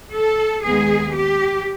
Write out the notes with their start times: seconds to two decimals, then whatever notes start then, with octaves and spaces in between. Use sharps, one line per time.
0.13 A4
0.63 D#2 D#3 G#3 B3 G#4
1.14 G4